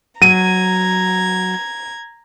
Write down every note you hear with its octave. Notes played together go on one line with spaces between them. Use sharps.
F#3 A#5 G#6 D#7